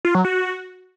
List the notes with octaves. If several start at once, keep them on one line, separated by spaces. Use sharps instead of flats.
F4
F#3
F#4